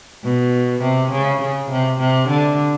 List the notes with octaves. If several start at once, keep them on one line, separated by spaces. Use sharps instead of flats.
B2
C3
C#3
C#3
C3
C3
D3